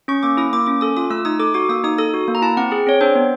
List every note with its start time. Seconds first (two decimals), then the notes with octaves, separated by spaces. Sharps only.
0.08 C#4 C#6
0.23 A#3 D6
0.37 E4 D#6
0.53 A#3 D6
0.67 C#4 D6
0.81 A4 D#6
0.97 F4 D#6
1.10 A3 E6
1.25 D#4 D#6
1.40 A4 D6
1.54 F#4 D6
1.69 A#3 D#6
1.84 D#4 D#6
1.98 A4 D#6
2.14 F#4
2.28 A#3
2.35 A#5
2.42 E4 A5
2.57 C4 F#5
2.72 G#4
2.87 C4 C#5
3.01 D4 C5
3.15 B3